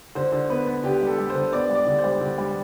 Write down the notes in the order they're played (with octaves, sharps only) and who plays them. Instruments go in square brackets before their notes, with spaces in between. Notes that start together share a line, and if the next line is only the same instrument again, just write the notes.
[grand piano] D3 [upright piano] C5
[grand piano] D3
[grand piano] B3 [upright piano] B4
[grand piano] B3
[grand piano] D3 [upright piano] G4
[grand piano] G3
[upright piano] A4
[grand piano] G3
[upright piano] C5
[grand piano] D3
[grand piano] B3 [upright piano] D5
[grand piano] G3
[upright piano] D5
[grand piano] D3
[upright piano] C5
[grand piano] G3
D3
G3